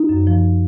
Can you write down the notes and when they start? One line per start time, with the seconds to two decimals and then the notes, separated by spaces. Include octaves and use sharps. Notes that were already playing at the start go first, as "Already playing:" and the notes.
Already playing: D#4
0.09 F#2
0.27 F3